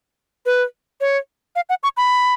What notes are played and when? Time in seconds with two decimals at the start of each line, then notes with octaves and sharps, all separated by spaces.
0.46 B4
1.01 C#5
1.56 F5
1.69 F#5
1.83 C#6
1.97 B5